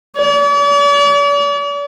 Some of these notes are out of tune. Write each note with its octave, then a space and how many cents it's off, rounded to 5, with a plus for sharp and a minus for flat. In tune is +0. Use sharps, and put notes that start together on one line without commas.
D5 -45